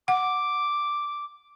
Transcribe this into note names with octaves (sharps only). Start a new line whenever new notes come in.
F#5 D6